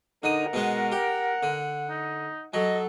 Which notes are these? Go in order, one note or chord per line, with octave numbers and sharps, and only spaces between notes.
D3 D#4 A#4 D#6
B2 G#3 B3 F#5
G4
D3
D#4
F#3 A4 D#5